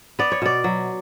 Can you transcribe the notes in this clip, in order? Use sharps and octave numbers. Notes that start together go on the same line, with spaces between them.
B3 D5
C#5
B2 D5
F#3